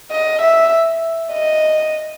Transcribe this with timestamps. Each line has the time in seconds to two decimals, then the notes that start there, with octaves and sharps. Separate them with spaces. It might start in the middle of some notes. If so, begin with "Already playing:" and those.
0.12 D#5
0.42 E5
1.32 D#5